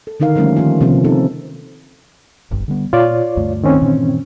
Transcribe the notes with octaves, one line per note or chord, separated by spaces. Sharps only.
A4
D3 D#3 D#4 A#4 F5
D3 F3 G3 A3 A#3 C#4
D#3 F4
C3 D#3 F3 A#3 B3 C#4
C4 D#4 A4
D1 G1 G2
D3 G3 B3
A#2 F4 C#5 D5
D2 G2 A3
D#3 C4 C#4
G2 A#2 E3